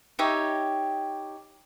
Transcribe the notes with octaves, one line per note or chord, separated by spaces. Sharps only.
D#4 G4 C#5 E5